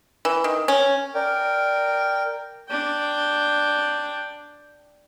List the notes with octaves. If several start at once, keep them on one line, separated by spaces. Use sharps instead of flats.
E3
D#3
C#4
A#4 D5 G5
D4 G5